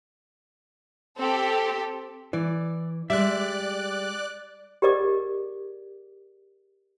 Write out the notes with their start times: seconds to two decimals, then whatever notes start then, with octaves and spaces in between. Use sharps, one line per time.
1.18 C4 G4 A4
2.33 E3 D5
3.10 G3 G#3 D5 E5 F#6
4.82 G4 G#4 A#4 D5 D#5 D6